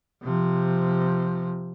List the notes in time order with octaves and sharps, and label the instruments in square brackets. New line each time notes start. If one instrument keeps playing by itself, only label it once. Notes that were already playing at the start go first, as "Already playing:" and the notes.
[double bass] C3 F3